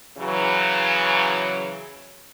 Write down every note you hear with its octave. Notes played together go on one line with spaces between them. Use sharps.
C#3 E3 F#3